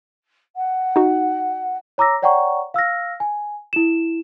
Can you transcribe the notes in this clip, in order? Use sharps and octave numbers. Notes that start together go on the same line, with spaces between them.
F#5
D#4 F#4
C#5 A#5 D6 E6 A#6
C#5 D5 F#5 G5 A#5 C#6
F5 E6 F6 A#6
G#5
E4 E7